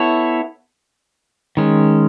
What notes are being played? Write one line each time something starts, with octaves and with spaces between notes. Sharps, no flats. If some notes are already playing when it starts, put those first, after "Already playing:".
Already playing: B3 E4 A4 C#5
D#3 G#3 C#4